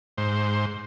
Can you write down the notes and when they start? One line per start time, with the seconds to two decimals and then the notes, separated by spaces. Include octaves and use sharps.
0.18 G#2 C5